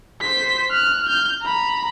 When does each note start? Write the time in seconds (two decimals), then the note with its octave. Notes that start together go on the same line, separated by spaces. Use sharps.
0.21 C5 B6
0.71 F6 F#6
1.08 F6 G6
1.42 A#5 B5